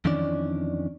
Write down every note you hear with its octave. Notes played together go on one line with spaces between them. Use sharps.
F2 D#3 E3 C#4 D4 D5